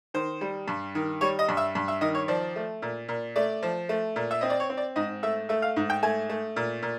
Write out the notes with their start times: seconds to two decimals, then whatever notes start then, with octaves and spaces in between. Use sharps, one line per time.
0.14 D#3 C5
0.41 G3
0.68 G2
0.95 D#3
1.21 G3 C#5
1.39 D#5
1.49 G2
1.57 E5
1.75 G2
1.88 E5
2.01 D#3 D#5
2.15 C#5
2.28 F3 D5
2.56 A3
2.82 A#2
3.09 A#2
3.36 A3 D5
3.63 F3
3.89 A3
4.16 A#2
4.31 E5
4.41 C4 D#5
4.50 D5
4.60 C#5
4.70 C4
4.77 D5
4.96 G#2 D#5
5.23 A3 E5
5.49 A3 E5
5.62 F5
5.76 G#2
5.90 G5
6.03 A3 G#5
6.29 A3
6.56 A#2
6.82 A#2